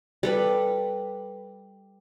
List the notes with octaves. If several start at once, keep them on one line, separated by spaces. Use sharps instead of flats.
G3 A4 B4